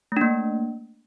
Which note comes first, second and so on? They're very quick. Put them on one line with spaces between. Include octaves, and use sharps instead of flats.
A3 D4 A#3